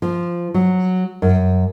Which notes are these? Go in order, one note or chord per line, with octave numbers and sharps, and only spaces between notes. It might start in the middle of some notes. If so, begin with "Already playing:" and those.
F3
F#3
F#2